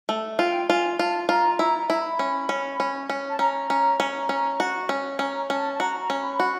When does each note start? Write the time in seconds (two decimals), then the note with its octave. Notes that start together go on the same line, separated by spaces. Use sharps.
0.09 A3
0.39 F4 G5
0.69 F4 G#5
0.99 F4 A5
1.29 F4 A#5
1.59 E4 A#5
1.79 A#5
1.90 E4 A#5
2.00 B5
2.19 C#4
2.49 C#4
2.80 C#4
3.10 C#4
3.30 A5
3.39 C#4 A#5
3.70 C#4
4.00 C#4
4.29 C#4
4.60 F#4
4.89 C#4
5.19 C#4 A#5
5.50 C#4 A5
5.73 A5
5.79 F#4 A#5
6.00 A#5
6.10 C#4
6.20 B5
6.40 F#4